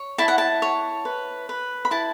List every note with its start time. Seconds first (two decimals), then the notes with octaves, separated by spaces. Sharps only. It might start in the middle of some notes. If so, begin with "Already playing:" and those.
Already playing: C#5
0.18 E4 A5
0.28 F#5
0.38 A5
0.62 C#5
1.05 B4
1.49 B4
1.85 B5
1.91 E4 A5